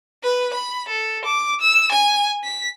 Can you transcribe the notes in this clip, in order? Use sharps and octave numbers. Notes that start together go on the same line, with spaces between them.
B4
B5
A4
D6
E6
G#5
B6